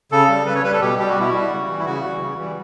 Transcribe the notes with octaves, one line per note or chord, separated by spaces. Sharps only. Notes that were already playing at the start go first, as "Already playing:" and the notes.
C#3 A4
G3
C#3 B4
C#5
G3 B4
A4
B2 G4
G3 G4
F#4
B2 E4
G3 F#4
C#3
E3 G3
E4
C#3 F#4
E3 G3
C#3
E3 G3